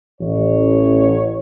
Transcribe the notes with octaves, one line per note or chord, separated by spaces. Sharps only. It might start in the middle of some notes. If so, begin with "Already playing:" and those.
A1 C#5